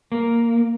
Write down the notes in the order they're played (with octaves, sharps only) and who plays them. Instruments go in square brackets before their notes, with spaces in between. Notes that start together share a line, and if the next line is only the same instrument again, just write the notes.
[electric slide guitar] A#3